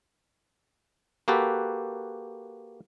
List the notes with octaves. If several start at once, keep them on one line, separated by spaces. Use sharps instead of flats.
A#3 F#4 G4 A4 B4